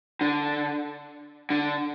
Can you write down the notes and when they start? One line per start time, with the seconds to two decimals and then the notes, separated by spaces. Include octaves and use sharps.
0.21 D3
1.50 D3